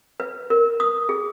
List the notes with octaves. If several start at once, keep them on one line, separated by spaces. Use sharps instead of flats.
B4
A#4
D#6
G#4